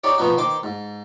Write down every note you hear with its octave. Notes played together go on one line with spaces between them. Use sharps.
D#4 G4 C#5 D5
B2 F3 B3 D#4 F#4
D#3 C5 G5 D6
G#2